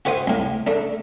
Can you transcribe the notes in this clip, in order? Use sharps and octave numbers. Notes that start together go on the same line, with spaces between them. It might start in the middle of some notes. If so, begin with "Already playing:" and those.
F#4 G4 C5 E5 D#6
C2 A2
A3 D4